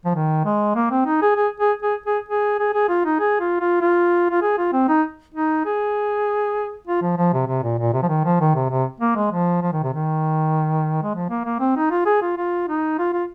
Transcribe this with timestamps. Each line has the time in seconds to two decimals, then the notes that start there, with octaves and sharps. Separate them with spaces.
0.05 F3
0.15 D#3
0.45 G#3
0.75 A#3
0.91 C4
1.06 D#4
1.22 G#4
1.36 G#4
1.60 G#4
1.83 G#4
2.06 G#4
2.29 G#4
2.59 G#4
2.74 G#4
2.89 F4
3.05 D#4
3.20 G#4
3.40 F4
3.60 F4
3.81 F4
4.30 F4
4.42 G#4
4.58 F4
4.73 C4
4.88 D#4
5.35 D#4
5.65 G#4
6.87 F4
7.02 F3
7.17 F3
7.33 C3
7.47 C3
7.63 A#2
7.79 A#2
7.93 C3
8.03 F3
8.09 D#3
8.25 F3
8.40 D#3
8.55 C3
8.70 C3
9.00 A#3
9.16 G#3
9.32 F3
9.62 F3
9.72 D#3
9.83 C3
9.94 D#3
11.03 G#3
11.15 F3
11.30 A#3
11.45 A#3
11.60 C4
11.77 D#4
11.91 F4
12.06 G#4
12.22 F4
12.37 F4
12.68 D#4
12.99 F4
13.14 F4